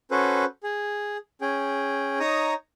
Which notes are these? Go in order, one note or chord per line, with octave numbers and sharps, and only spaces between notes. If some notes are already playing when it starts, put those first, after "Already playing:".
C#4 F#4 A4 B4 C5
G#4
C#4 G#4 G5
D#4 C#5 A#5 D#6